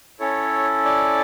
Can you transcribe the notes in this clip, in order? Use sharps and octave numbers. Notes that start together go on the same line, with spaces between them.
C#4 E4 A4 C#5
D5